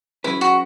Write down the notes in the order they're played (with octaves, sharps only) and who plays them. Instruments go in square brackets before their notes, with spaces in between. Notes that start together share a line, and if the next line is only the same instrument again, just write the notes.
[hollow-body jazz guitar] F#3 C#4 G#4 B4 [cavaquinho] E4
[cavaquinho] F#4